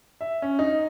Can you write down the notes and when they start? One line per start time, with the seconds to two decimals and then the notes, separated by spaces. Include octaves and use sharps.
0.21 E5
0.42 C#4
0.59 D#4